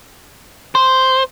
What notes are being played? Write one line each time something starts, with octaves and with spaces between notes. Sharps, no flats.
C5